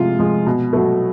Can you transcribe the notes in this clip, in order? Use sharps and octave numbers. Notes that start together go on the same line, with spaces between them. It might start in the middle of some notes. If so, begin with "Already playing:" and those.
Already playing: C3 F3 G#3 F4
F3 G#3
B2
F#3 A3